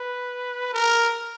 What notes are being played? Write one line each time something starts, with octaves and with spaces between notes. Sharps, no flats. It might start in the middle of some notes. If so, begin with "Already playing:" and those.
Already playing: B4
A#4